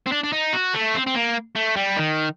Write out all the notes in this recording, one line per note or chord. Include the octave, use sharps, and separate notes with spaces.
C4
D4
D4
D#4
F#4
A3
C4
C4
A#3
A3
G3
D#3